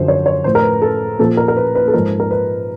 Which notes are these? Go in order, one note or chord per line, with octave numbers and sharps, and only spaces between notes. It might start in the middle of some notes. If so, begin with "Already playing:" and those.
Already playing: F#2 D3 F3 C5
C#5
C#5
A2 F3 C5
A#4
B4
A4
A#2 F3 A4
A#4
A#4
B4
B4
A4
G#2 F3 A#4
A#4
B4